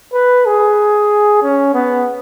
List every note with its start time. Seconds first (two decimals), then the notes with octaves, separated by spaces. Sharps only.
0.13 B4
0.46 G#4
1.42 C#4
1.74 B3